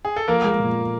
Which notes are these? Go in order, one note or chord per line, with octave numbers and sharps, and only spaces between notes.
G#4
A4
F3 A#3 A#4
G#3
A#2